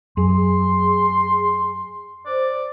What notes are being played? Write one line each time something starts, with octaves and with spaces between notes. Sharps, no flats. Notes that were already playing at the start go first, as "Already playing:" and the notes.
F#2 G#4 C6
C5 D5